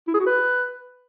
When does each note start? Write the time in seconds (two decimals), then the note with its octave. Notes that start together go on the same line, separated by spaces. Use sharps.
0.08 E4
0.14 G#4
0.20 F#4
0.26 B4